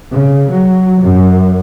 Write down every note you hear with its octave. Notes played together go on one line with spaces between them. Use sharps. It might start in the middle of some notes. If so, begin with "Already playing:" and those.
C#3
F#3
F#2